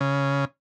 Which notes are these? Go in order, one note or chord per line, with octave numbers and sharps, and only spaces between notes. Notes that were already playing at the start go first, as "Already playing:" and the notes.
C#3